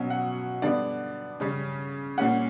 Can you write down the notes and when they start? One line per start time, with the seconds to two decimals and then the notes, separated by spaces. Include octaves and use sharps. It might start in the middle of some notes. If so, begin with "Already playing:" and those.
Already playing: B2 F#3 C#4
0.10 F#5
0.62 D3 G3 B3 D5
1.40 C#3 G3 C#4
2.18 A#2 G3 C#4 F#5